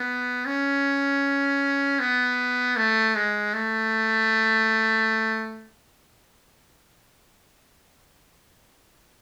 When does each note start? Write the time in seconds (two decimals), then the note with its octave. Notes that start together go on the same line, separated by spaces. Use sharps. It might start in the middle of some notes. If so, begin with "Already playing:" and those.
Already playing: B3
0.46 C#4
2.00 B3
2.77 A3
3.15 G#3
3.54 A3